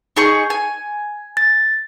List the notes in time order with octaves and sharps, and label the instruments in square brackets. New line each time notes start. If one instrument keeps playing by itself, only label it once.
[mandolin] D#4 G#4 C#6
G#5
[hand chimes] A6